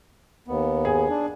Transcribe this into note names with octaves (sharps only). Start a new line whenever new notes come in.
D#2 B3
G#4
D4